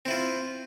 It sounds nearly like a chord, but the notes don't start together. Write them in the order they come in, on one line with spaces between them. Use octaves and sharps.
C4 E4 F4